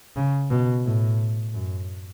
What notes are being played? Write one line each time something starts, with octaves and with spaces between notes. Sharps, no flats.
C#3
B2
A2
F#2